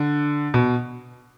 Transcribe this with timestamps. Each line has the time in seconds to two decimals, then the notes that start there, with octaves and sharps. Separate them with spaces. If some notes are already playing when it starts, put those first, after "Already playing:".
Already playing: D3
0.54 B2